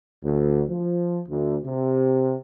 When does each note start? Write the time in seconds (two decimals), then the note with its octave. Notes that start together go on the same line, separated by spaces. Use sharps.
0.24 D2
0.70 F3
1.29 D2
1.65 C3